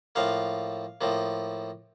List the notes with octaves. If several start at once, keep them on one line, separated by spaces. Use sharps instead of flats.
A2 F3 A#3 F5
A2 F3 A#3